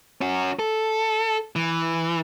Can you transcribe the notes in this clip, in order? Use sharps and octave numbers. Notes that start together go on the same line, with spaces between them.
C#4 F#4
A4
E3